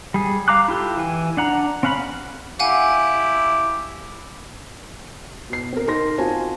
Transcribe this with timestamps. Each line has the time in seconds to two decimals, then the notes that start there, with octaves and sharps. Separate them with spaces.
0.14 G3 G#4
0.48 F5 A#5 D6 F#6
0.68 E4 F4 G4 A4
0.97 E3 G#5
1.37 D4 F#5 A#5
1.83 C4 C#4 F5 F#5 B5
2.59 E4 G4 F5 F#5 G#5
5.50 B2 C7
5.73 C4 A#4
5.87 D#4 A#4 C6 A#6
6.18 C4 F4 F#4 C5 G#5 A5